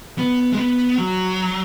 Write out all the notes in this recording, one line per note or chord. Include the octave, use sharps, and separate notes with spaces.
B3
G#3
B3
F#3